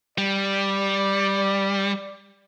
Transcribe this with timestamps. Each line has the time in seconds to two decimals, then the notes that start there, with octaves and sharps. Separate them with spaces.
0.18 G3 D5